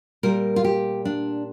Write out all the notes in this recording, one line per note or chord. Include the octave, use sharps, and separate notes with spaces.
A#2 G3 A#4
F4
G4
D4